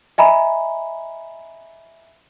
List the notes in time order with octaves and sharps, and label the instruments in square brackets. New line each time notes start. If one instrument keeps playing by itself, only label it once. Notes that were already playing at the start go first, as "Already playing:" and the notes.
[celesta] D#5 E5 G#5 A#5 B5